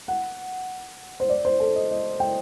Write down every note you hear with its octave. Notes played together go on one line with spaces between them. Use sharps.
F#5
C5
D5
C5
A4
D#5
D#5
G5